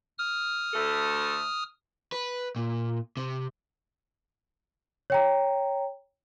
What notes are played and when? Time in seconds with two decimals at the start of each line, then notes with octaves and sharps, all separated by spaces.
0.18 D#6 F6
0.74 D2 A3 A4
2.12 B4
2.56 A#2
3.17 C3
5.10 C#5 G5 A#5